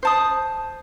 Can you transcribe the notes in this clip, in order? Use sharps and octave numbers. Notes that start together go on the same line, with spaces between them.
C5 A5 D#6